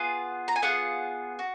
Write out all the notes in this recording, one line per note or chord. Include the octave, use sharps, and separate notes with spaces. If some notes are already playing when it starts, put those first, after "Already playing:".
Already playing: B3 F4 G#4
A#5
G#5
B3 F4 G#4 F#5
F#4